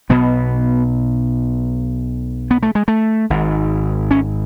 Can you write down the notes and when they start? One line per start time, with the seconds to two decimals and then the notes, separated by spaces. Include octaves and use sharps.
0.10 B1 B2 B3
2.51 B3
2.63 A3
2.75 G#3
2.88 A3
3.30 G#1 G#2
4.11 C#4